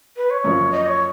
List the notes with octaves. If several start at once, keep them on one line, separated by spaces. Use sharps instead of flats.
B4
C#5
F#2 F3 A#3 F4
D#5
C#5